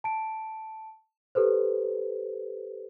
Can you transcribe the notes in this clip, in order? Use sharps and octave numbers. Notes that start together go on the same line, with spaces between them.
A5 D7
G4 A4 B4 C5